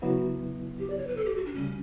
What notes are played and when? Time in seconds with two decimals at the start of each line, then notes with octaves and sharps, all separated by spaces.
0.02 C#2 C#3 F#3 B3 E4 F#4
0.79 G4
0.90 D5
0.98 C#5
1.07 B4
1.17 A4
1.26 G4
1.36 F#4
1.45 D4
1.54 D2 C#3 G3 C#4